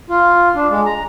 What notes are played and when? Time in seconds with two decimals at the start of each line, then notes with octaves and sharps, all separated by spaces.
0.10 F4
0.55 D4
0.70 G#3
0.86 A#5